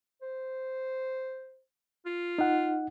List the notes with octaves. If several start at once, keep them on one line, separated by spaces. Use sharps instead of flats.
C5
F4
D#4 F#5